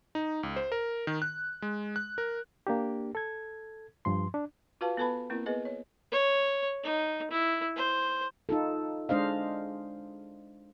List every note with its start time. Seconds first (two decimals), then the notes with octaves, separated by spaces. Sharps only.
0.15 D#4
0.43 C#2
0.56 C5
0.72 A#4
1.07 D#3
1.22 F#6
1.62 G#3
1.96 F#6
2.18 A#4
2.67 A#3 D4 G4
3.15 A4 G#6
4.05 G2 F3 C6
4.34 D4
4.81 F4 F#4 B4 F5 A5
4.97 B3 A4 B4 A5 B5
5.30 A#3 C4 E4 A#4
5.46 B3 G#4 B4 D#5
5.65 C#5
6.12 C#5
6.84 D#4
7.31 E4
7.76 C5
8.49 D#4 F4 A4
9.09 G#3 D4 C5 D#5 F5